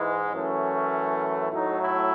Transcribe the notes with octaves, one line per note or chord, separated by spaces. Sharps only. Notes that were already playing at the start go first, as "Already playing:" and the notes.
Already playing: G#2 E3 G#3
F#2 E3 A3 C#4
A2 F#3 A3 D#4
E4